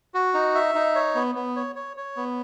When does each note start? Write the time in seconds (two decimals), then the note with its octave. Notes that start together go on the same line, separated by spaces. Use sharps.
0.14 F#4
0.34 D#4
0.55 E5
0.75 D#4
0.95 C#5
1.15 B3
1.35 B3
1.56 C#5
1.76 C#5
1.97 C#5
2.16 B3